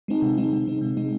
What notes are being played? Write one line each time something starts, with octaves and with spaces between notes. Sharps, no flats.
G#3 C4 D#4
C3
G#3 C4 D#4
C3
G#3 C4 D#4
C3
G#3 C4 D#4